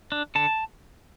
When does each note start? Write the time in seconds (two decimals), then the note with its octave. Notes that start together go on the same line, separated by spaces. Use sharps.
0.12 D4
0.35 D3 A5